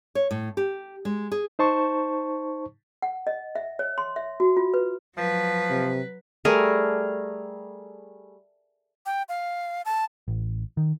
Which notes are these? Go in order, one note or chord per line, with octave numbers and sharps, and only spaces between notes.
C#5
A2
G4
G#3
G#4
D#4 C5 A5 C#6
F#5
D#5
E5
C#5
C6
E5
F#4
F4
B4
F3 F#3 B4
C3
G3 A3 G#4 A#4
G5
F5
A5
A1
D#3